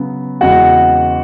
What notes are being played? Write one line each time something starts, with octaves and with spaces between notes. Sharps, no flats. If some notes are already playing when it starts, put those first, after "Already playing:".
Already playing: C#3 F#3 B3
E2 C#3 G#3 F#4 F#5